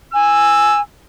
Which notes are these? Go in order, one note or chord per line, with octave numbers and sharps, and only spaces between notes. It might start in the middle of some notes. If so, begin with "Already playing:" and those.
G#5 E6